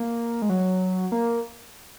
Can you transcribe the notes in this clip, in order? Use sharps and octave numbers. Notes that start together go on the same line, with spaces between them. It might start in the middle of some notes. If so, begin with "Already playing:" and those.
Already playing: A#3
G#3
F#3
A#3